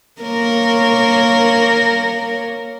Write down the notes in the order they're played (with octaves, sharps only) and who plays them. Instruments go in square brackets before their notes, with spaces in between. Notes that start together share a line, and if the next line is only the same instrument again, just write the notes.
[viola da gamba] A#3 A#4 C#5